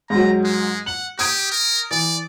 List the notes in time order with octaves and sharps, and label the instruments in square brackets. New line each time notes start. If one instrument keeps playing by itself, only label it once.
[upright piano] G#2 F#3 [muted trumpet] A#5
[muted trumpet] G#3
[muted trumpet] F#5 [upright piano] F#7
[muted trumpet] G4 [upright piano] D#6 G#6 D7
[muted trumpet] A#4
[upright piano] E3 [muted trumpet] D5